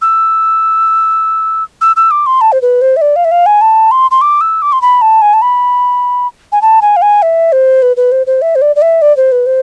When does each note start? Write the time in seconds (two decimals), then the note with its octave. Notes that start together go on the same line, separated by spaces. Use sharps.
0.02 E6
1.81 E6
1.96 E6
2.11 D6
2.26 C6
2.41 A5
2.52 C5
2.62 B4
2.82 C5
2.97 E5
3.02 D5
3.16 F5
3.25 E5
3.31 F5
3.46 G#5
3.61 A5
3.91 C6
4.11 C6
4.21 D6
4.41 E6
4.62 D6
4.73 C6
4.82 B5
5.02 A5
5.22 G#5
5.34 A5
5.42 B5
6.52 G#5
6.62 A5
6.82 G#5
6.96 F5
7.02 G#5
7.22 E5
7.52 C5
7.82 B4
7.97 B4
8.12 C5
8.27 C5
8.42 E5
8.55 C5
8.62 D5
8.76 D5
8.82 E5
9.02 D5
9.17 C5
9.32 B4
9.46 C5